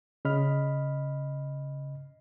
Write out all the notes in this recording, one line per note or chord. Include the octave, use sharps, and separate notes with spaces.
C#3 D#5 B5 F6